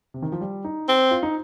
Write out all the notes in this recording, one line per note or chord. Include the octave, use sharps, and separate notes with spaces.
C3
D#3
F3
G3
D#4
C4
F4
D#4